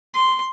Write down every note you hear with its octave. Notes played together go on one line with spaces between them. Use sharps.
C6